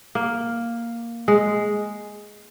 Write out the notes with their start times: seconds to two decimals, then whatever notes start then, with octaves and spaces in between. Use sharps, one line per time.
0.15 A#3
1.28 G#3